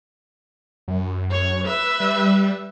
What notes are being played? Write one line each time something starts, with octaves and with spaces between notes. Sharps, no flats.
F#2
C#5
B4 E5
G3